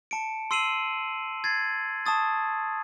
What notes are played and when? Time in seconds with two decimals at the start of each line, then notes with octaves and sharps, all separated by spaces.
0.11 A5 C#7 D7
0.51 C6 E6 C7 D#7 E7 F#7
1.44 G#6 A6 C7
2.06 A5 C#6 D#6 A6